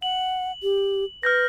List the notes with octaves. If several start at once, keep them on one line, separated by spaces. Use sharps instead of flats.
F#5 F#7
G4
B4 F6 G6 A#6